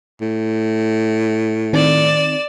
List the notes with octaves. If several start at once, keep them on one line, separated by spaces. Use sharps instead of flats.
A2
D#3 C4 D5 E7